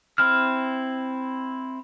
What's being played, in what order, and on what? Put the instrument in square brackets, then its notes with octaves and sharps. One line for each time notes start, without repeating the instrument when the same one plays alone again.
[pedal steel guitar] C4 E4 F6